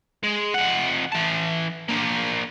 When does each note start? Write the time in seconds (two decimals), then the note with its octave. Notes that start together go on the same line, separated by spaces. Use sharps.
0.23 G#3
0.54 F2 F#5
1.12 E3 A5
1.89 A#3 D4